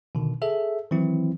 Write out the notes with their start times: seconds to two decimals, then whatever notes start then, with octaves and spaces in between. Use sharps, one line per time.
0.15 B2 D3 D#3
0.42 G#4 A4 E5
0.91 D#3 E3 F#3 C4 E4